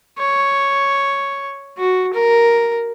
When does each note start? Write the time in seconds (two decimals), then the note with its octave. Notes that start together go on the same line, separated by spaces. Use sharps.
0.19 C#5
1.78 F#4
2.13 A#4